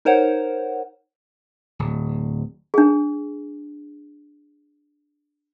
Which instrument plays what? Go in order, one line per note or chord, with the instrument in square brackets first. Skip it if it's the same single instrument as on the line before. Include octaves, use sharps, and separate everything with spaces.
[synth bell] D#4 A#4 C5 C#5 F#5
[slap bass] D1
[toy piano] D4 G#4